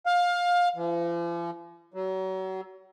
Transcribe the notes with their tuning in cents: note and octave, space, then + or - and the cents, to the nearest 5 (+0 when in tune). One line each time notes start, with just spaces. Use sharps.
F5 +20
F3 -45
F#3 +35